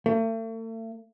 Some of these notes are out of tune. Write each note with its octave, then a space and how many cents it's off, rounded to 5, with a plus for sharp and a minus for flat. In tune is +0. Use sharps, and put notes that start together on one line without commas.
A3 +40